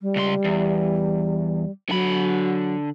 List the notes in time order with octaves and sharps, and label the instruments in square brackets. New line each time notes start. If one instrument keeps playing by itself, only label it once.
[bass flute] G3
[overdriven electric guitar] C#2 C6
E2
[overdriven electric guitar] D3 B5 [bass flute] F#3